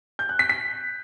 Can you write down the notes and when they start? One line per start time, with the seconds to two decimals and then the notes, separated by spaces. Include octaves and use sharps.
0.19 G6
0.29 F#6
0.39 B6
0.49 B6